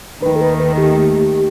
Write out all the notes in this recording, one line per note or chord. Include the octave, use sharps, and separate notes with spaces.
D#2 D#3 A3 B4
A4
B4
B4
G4